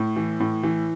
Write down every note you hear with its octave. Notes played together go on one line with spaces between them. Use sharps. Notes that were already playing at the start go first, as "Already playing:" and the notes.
Already playing: A2
E3
A2
E3